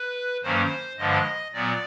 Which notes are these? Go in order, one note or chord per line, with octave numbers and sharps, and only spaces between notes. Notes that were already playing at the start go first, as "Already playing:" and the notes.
Already playing: B4
G2 D#3 F#3 A#3 C#4 C5
G2 D3 F3 G#3 D#5
A#2 F#3 B3 D5